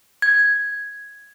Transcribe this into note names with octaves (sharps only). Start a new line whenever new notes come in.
G#6